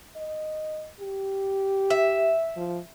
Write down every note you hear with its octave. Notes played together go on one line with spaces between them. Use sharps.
D#5
G4
E5
F3